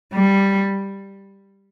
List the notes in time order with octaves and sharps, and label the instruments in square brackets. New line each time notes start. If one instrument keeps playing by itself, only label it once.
[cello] G3